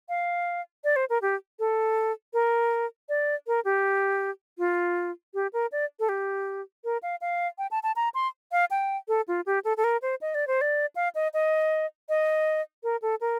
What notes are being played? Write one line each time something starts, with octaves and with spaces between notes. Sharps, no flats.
F5
D5
C5
A#4
G4
A4
A#4
D5
A#4
G4
F4
G4
A#4
D5
A4
G4
A#4
F5
F5
G5
A5
A5
A#5
C6
F5
G5
A4
F4
G4
A4
A4
A#4
C5
D#5
D5
C5
D5
F5
D#5
D#5
D#5
A#4
A4
A#4